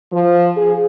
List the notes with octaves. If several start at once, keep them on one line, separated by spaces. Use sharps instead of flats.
F3
G#4